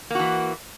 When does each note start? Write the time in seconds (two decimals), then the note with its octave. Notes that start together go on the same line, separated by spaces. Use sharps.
0.10 A#3
0.15 F#4
0.20 E3